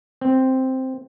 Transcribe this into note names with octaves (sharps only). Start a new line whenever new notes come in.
C4